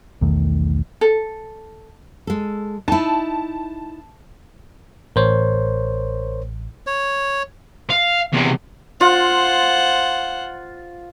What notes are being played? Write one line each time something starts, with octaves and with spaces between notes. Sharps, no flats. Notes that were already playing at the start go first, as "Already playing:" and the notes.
B1 E2 D#3 A3
A4
G#3 A4
D#4 E4 A5
A1 A#4 C5 C#5
C#5
F5
E2 C3
F4 C5 F#5